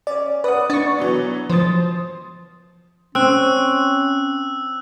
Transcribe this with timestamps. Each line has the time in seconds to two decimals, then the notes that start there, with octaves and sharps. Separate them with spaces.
0.07 C#4 D5
0.44 B4 D5 F#5 D#6
0.70 D4 D5 C#6 A6
0.98 E3 F#3 B3
1.50 F3 C5 D#6 A6
3.15 C4 C#4 E6 F#6